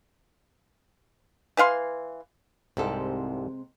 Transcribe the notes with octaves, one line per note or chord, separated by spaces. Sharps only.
E3 B4 F5 C6
C2 G#2 C3 G#3 C4 G4 A4